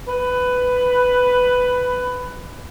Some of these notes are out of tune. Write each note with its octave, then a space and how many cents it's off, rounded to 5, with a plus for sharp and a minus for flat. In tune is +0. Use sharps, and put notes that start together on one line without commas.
B4 +10